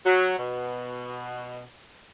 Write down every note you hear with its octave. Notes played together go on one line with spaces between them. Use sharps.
F#3
B2